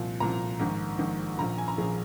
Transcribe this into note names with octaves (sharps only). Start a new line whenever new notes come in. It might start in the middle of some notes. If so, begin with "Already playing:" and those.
Already playing: C2 A#2 F3
C2 A#2 F3 A#5
A#1 G#2 D#3
A#1 G#2 D#3
A#1 A#2 F3 A#5
G#5
A#5
A#1 A#2 F3 G#4